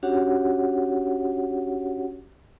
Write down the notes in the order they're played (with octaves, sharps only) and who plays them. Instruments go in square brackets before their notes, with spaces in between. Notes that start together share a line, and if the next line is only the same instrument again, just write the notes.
[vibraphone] C#4 D4 F#4 G4 C#5 F#5